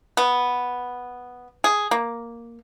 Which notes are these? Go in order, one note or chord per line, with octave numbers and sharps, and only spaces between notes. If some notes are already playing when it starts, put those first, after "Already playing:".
B3
G#4
A#3